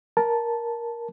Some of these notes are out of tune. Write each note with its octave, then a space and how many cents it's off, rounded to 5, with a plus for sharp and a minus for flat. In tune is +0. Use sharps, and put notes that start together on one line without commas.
A#4 +10 A5 -5